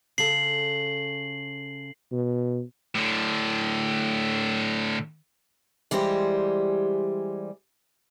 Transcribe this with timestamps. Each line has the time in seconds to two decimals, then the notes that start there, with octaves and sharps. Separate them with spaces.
0.18 C#3 A4 C7 F#7
2.12 B2
2.95 A2 D3
5.91 E3 G3 G#3 G4 C5